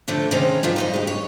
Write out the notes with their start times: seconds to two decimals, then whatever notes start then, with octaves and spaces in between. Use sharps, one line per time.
0.08 A2 D3 F3 A3
0.31 C3 D#3 G#3 C#4 A#5
0.63 G2 D#3 F3 F4
0.76 F2 D#4 D#5
0.94 G#3 G4
1.07 C#5